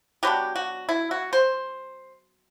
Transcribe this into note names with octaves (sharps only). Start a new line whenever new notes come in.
F#3 B3 D4 G4
F#4
E4
F#4
C5